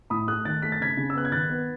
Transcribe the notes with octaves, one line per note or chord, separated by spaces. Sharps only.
A2 B5 D#6
A3 D#6 F#6
D#3 F#6 A6
A3 B6
A6
C#3 G#6 B6
C#3
E6
B3 F#6
G#6
D#3 F#6 A6
B3